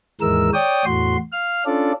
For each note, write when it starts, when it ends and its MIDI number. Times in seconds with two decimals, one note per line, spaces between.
0.21 0.50 39
0.21 0.50 44
0.21 0.50 52
0.21 0.50 56
0.21 0.50 70
0.21 0.50 88
0.54 0.85 73
0.54 0.85 74
0.54 0.85 79
0.54 0.85 87
0.85 1.17 40
0.85 1.17 45
0.85 1.17 66
0.85 1.17 84
1.32 1.64 77
1.32 1.64 89
1.66 1.92 61
1.66 1.92 62
1.66 1.92 65
1.66 1.92 69
1.66 1.92 74